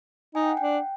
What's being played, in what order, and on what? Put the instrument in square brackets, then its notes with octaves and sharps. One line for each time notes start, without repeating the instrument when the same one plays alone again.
[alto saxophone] D#4 [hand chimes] G#5
[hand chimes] G5
F#5
[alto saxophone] D4 [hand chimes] G5